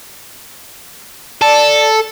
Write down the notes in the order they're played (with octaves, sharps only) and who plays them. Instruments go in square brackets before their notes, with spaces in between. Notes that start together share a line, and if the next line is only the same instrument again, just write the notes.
[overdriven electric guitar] A4 [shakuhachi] D5